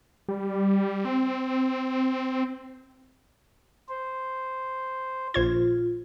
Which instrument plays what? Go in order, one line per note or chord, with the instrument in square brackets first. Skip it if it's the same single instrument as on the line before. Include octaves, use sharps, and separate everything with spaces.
[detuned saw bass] G3
C4
[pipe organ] C5
[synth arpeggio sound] A#1 C5 G#6 [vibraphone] F4